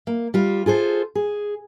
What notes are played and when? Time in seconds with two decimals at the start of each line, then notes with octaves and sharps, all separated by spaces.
0.07 A#3
0.34 G3 F4
0.66 F4 G#4 A4 C5
1.15 G#4